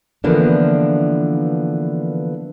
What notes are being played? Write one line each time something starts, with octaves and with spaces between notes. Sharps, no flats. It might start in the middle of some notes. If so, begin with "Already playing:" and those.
D3 E3 F3 A#3 B3 D4